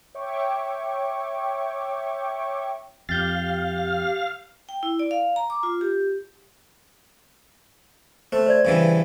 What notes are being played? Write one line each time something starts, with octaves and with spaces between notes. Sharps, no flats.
C#5 E5 G5 C#6 D6
F2 G4 F5 G6 A6
G5
E4
D5
F5
A#5
D6
F4
G4
A3 C5
C5 D5 G#6
G2 C#3 E3